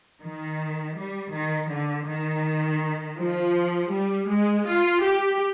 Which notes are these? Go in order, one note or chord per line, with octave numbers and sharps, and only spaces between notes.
D#3
G3
D#3
D3
D#3
F3
G3
G#3
F4
G4